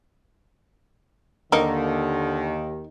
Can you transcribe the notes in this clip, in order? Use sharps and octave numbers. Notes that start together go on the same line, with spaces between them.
D#2 D3 D#3 A#3 D#4